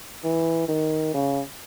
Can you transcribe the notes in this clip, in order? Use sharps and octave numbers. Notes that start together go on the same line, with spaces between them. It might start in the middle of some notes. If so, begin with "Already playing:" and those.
E3
D#3
C#3